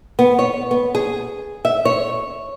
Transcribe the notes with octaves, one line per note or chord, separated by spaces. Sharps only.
B3
C#5
B3
G#4
E5
C#5